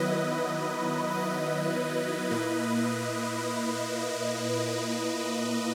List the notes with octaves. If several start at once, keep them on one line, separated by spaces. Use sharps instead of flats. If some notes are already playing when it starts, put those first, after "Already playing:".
Already playing: D#3 F#3 B3 E4 B4 D#5
B4 D#5
A#2 A#3 E4